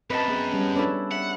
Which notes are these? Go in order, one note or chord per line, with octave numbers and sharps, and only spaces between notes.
F#2 C4 B4 D#5 A5
B3 G#4
G3 C#4
D4 E4 A4 B4 C#5
E5 F#5